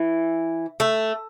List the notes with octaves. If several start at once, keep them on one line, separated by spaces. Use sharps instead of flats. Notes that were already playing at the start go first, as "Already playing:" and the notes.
Already playing: E3
A3